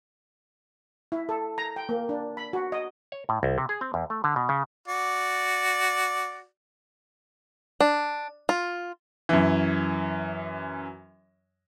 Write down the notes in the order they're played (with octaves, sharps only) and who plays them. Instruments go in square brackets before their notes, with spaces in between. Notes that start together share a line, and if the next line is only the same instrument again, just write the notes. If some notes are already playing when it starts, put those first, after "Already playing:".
[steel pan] E4
A4
A#5
G5
A#3
D4
B5
F#4
D#5
[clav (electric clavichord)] C#5
A2
C2
C3
G#4
C4
E2
A3
D3
B2
C#3
[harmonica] F#4 D5
[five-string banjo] D4
F4
[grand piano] F#2 E3